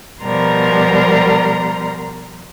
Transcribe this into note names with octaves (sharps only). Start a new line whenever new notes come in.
B2 F3 G3 A#4 A#5 C6